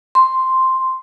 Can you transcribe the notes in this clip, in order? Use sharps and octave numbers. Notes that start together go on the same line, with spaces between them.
C6